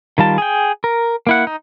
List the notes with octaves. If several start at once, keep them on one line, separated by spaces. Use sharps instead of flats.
D#3 G3 F4 A5
G#4 G5
A#4
A#3 E4 F#5
D#4